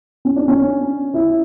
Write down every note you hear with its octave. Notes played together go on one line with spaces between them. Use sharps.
C#4
D4
C#4
E4